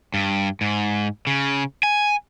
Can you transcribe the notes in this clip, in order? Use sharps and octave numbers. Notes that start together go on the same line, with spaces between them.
G2
G#2
C#3
G#5